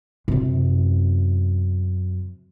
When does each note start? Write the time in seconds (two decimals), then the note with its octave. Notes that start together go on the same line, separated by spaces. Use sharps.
0.28 F#2 C3